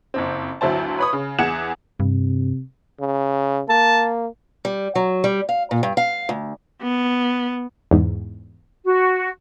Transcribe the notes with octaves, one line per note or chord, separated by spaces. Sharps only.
F#1 F2 C4
G1 D2 F#3 E4 C5 A5
B4 C#5 B5 C#6 D#6
C#3
E2 G#4 F#5 G#6 C#7 E7
G2 C3
C#3
A#3 A5
G3
F#3
G3
F5
A#2
G2
F5
D2
B3
E2 G#2
F#4